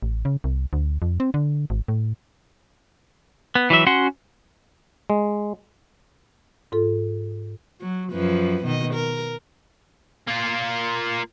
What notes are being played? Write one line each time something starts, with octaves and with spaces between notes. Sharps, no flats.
A1
C#3
C2
D2
F2
C4
D3
G#1
A2
B3
E3 F#3 E5
C#4 F#4 F#5 C6
G#3
G#2 F4 A4
F#3
F#2 F3 B4
B2 D#3 D#5
A#4
A#3 F4